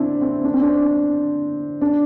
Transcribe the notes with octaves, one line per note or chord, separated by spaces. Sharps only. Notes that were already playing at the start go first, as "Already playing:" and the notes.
Already playing: C4 D4 E4
C4
D4
C4
D4
D4